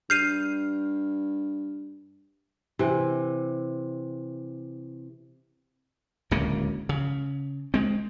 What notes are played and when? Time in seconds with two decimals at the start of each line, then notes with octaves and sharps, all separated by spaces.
0.10 G2 F6 G6 C7 D#7
2.79 C3 E3
6.31 D1 C#2 C#3 A#3
6.89 C#3
7.74 G#3 C4